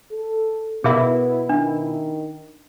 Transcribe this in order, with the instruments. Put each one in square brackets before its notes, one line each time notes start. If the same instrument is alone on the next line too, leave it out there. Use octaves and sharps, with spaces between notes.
[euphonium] A4
[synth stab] B2 E4 [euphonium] B3 [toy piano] G#4 A#4 E5
[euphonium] D#3 [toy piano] D4